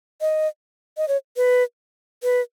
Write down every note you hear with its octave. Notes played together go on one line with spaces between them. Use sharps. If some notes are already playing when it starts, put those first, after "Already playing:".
D#5
D#5
C#5
B4
B4